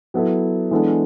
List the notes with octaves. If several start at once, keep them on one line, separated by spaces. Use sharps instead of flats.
F#3 B3 E4 A4
E3 G#3 B3 D4 A4